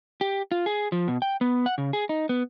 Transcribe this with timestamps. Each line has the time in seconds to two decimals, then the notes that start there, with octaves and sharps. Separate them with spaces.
0.21 G4
0.52 F4
0.66 G#4
0.92 F3
1.08 B2
1.22 G5
1.41 B3
1.66 F#5
1.78 C#3
1.93 G#4
2.09 D#4
2.29 B3